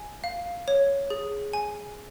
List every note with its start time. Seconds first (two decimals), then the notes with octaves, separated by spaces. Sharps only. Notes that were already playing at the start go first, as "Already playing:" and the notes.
Already playing: G#5
0.24 F5
0.68 C#5
1.10 G#4
1.53 G#5